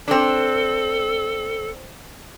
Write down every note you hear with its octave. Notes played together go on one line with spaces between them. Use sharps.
C4 D4 A4